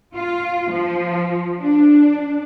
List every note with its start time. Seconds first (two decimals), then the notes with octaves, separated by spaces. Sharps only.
0.16 F4
0.72 F3
1.61 D4